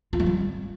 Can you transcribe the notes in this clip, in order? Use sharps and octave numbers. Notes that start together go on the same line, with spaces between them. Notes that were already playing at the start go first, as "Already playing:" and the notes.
F4
G#3
G3